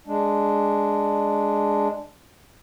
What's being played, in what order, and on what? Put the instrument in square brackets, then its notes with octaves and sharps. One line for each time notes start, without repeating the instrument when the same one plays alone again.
[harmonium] G#3 D4